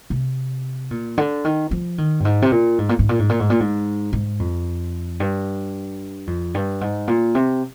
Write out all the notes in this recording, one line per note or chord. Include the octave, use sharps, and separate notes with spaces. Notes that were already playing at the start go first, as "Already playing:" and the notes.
C3
A#2
D3
D#3
F3
D#3
G2
G#2
C3
A#2
G#2
A#2
G#2
A#2
G#2
A#2
G#2
A#2
G#2
G#2
F2
G2
F2
G2
G#2
A#2
C3